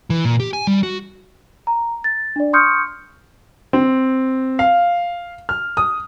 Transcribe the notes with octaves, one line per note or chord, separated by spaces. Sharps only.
E3
A#2
G4
G#5
G3
F#4
A#5
A6
D4 D5
C6 C#6 D#6 F6 G6 C#7
C4
F5
F6
D#6